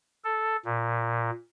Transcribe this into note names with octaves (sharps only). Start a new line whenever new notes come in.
A4
A#2